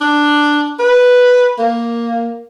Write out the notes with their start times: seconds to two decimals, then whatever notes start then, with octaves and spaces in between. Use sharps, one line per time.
0.01 D4
0.79 B4
1.58 A#3